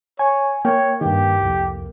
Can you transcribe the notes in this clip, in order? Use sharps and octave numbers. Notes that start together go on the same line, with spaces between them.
C#5 G#5
A#3 C#5 G5
G2 D#3 G4
C2 F2